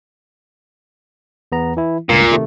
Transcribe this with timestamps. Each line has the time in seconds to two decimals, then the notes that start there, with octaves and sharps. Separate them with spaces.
1.52 E2 B3 A#5
1.77 E3 E4
2.09 C#2 G2 A#2
2.30 C3 D#3 A3